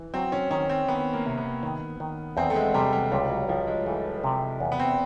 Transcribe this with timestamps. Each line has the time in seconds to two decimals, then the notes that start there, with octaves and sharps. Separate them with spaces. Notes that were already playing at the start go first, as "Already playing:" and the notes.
Already playing: E3
0.14 F#3 C4
0.32 C#4
0.51 D#3 C#4
0.69 C4
0.88 D#3 B3
1.13 A#3
1.26 C3
1.38 B3
1.63 D#3
2.00 D#3
2.37 E2 C4
2.50 A3
2.56 G#3
2.74 C3 G3
2.93 G3
3.12 C#2 G3
3.30 F#3
3.49 C#2 F3
3.67 G#3
3.86 E3 A3
4.24 C3
4.60 E2
4.72 B3
4.80 C4